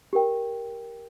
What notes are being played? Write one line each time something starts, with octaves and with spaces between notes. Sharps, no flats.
G4 A#4 G5